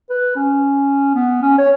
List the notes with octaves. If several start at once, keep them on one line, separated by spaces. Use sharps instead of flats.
B4
C#4
B3
C#4
C#5